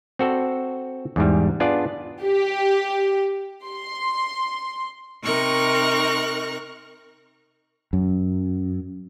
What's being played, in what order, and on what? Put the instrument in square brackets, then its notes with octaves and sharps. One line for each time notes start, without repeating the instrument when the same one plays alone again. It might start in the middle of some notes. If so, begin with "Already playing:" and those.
[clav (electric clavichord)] C4 F#4 A4 D5
E2 G#2 G3
B3 D4 F4 G#4 D5
[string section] G4
C6
[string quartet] C3 D#4 A#4 C#6 F#6
[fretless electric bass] F#2